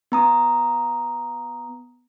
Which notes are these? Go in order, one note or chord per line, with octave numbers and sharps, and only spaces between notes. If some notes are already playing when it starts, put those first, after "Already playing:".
B3 A#5 D#6